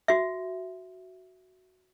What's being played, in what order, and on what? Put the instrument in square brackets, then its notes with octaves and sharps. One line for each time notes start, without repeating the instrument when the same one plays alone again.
[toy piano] F#4 E5